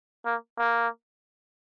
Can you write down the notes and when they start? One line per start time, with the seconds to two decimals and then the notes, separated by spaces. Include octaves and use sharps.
0.25 A#3
0.58 A#3